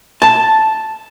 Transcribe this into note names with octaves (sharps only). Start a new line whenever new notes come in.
A5